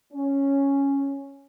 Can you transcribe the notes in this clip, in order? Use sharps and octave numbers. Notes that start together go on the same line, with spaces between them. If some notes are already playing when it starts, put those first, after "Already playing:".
C#4